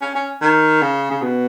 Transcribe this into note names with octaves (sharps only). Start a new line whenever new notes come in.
C#4
C#4
D#3
C#3
C#3
B2